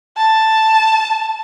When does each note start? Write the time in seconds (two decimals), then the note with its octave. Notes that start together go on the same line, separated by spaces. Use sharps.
0.17 A5